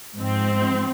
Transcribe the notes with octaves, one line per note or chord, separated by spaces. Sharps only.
G#2 F3 C4